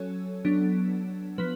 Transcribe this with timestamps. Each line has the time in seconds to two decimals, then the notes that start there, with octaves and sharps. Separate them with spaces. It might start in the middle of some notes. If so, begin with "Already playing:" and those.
Already playing: F#3 C#4 A4 C#5
0.45 F#3 B3 D4
1.38 F3 B3 B4